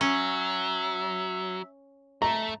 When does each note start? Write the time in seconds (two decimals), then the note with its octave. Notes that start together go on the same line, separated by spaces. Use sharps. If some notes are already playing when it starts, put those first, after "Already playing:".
0.01 F#3 C#4 E5
2.22 A3 A#5